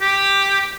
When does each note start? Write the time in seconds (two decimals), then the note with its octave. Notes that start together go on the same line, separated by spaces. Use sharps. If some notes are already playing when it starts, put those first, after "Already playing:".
0.01 G4